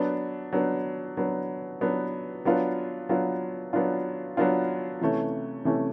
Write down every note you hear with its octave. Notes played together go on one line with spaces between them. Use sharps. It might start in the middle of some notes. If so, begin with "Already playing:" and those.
Already playing: F#3 B3 D4
F#3 B3 D4
F#3 B3 D4
F#3 B3 D4
F#3 B3 D4 F4
F#3 B3 D4 F4
F#3 B3 D4 F4
F#3 B3 D4 F4
C3 E3 A3 C#4
C3 E3 A3 C#4